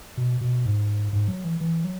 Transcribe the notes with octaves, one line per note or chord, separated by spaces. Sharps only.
B2
B2
G#2
G#2
F#3
E3
E3
F#3